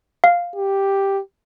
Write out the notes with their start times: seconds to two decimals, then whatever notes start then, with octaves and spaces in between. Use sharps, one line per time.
0.24 F5
0.56 G4